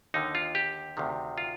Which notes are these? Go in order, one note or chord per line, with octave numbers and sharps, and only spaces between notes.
D#2 D3 D#4
F4
G4
D2 C3 D#3
F4